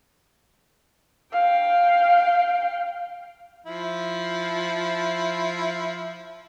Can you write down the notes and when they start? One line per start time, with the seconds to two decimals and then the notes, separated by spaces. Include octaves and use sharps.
1.32 F5 G5
3.66 F3 E4